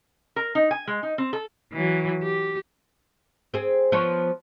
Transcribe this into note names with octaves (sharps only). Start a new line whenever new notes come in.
A#4
D#4
G#5
G#3
D#4
C4
A4
E3 F#3
G4
C4 G#4
F3 B3 C#5